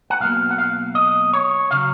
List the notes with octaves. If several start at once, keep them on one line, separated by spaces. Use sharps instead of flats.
F#5
B1 B2 A#3 F5
F#5
F5
D#5
C#5
C#3 F#3 F5